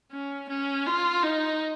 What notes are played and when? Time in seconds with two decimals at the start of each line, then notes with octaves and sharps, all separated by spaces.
0.12 C#4
0.49 C#4
0.86 F4
1.23 D#4